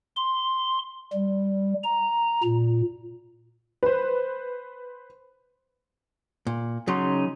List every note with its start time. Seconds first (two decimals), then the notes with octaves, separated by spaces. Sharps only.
0.16 C6
1.13 G3
1.83 A#5
2.44 A#2
3.83 B4 C5
6.47 A#2
6.88 C#3 F#3 D#4 C6